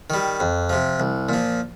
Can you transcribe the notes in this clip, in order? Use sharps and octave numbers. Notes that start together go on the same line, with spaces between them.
D#3 G3
F2
C3 F3
C2
A#2 F3